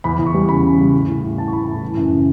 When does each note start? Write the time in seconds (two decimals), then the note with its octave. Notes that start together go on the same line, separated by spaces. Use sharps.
0.04 E2 B5
0.19 E2
0.27 C#6
0.34 G3
0.49 C#3 B5
0.64 C#3
0.78 G3
0.94 A2
1.08 A2
1.23 A2
1.38 A2 A5
1.48 C#6
1.53 A2 B5
1.67 A2
1.82 E3
1.97 F#2
2.12 C#3